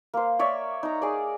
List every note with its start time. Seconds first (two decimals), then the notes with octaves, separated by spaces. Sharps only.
0.14 A#3 C5
0.39 C#5 D5 E5
0.83 D#4 A#5
1.02 G#4 D5